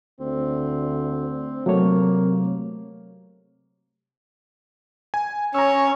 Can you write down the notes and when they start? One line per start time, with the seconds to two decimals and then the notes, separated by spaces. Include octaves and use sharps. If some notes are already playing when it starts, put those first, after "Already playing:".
0.20 D2 C4
1.66 C3 F#3 A3 A#3 C#5
5.14 G#5
5.54 C#4 C#5 A#5 E6